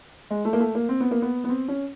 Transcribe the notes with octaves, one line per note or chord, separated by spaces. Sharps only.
G#3
A3
A#3
A3
A#3
C4
B3
A#3
B3
B3
C4
C#4